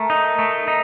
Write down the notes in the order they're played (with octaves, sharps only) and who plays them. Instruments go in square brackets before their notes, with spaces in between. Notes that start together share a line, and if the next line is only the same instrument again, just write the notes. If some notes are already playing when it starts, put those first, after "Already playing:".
Already playing: [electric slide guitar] A3 [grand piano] A#4
[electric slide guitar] D#4
A3
D#4